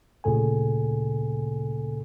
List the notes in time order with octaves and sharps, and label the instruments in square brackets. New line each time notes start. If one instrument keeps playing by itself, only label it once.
[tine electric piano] D2 A#2 C#3 A4 G#5